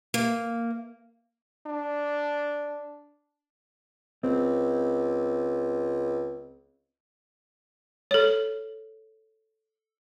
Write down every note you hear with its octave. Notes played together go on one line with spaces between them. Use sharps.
A#3
D4
C#2 C4
A4 C#5